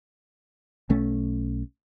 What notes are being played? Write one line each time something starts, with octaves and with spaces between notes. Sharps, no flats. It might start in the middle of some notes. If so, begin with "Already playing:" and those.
B1 A3 C#4